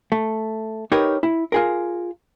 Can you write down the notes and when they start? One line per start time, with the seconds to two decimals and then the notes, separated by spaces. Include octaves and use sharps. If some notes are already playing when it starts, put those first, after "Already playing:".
0.12 A3
0.92 D#4 G4 A#4 B4 C#5
1.23 E4
1.52 F4 G#4 A#4